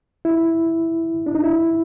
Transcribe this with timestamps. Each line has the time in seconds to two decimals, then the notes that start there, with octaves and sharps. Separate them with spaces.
0.25 E4
1.26 D4
1.35 D#4
1.44 E4